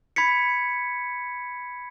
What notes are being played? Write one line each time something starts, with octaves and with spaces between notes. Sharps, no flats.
B5 G#6 B6 C#7